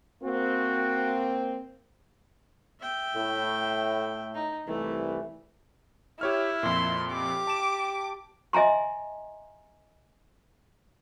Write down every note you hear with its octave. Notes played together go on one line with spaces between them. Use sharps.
A#3 C4 F#4
E5 G5
A2
D#4
C2 E3 A3
E4 G4 C#5 F6
F2 A#2 C6
G4 D6
A5 E7
D#5 E5 G#5 A#5 C6